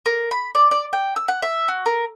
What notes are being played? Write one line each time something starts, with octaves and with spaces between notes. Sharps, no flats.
A#4
B5
D5
D5
G5
E6
F#5
E5
F#4
A#4